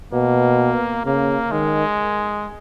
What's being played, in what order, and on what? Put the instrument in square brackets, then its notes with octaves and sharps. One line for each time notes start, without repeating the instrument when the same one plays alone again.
[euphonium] B2 [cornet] A#3
[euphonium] C#3 [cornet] A#3
[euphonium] D#3 [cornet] G#3